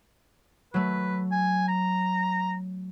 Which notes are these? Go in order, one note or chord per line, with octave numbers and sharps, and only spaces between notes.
F#3 A3 B4
G#5
A#5